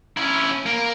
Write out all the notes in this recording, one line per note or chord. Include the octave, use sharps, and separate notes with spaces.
C#4 E4
A#3